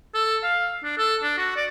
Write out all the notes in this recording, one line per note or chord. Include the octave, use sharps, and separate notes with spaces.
A4
F5
D4
A4
D4
F#4
D5